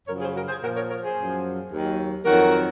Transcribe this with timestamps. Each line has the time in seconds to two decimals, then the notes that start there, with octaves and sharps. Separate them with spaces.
0.07 F#2 C#3 F3 A#4 C#5
0.21 G#4 C5
0.35 F#4 A#4
0.48 G#4 C5
0.61 A#2 F#4 A#4
0.65 F3
0.75 A#4 C#5
0.89 A#4 C#5
1.03 G#4 C5
1.16 F#2 F3
1.71 D#2 D#3 F#3
2.25 F2 D#3 F#3 F#4 A#4